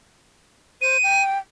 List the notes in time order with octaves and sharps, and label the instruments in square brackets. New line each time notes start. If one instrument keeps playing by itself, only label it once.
[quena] C5 [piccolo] D#7
[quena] G5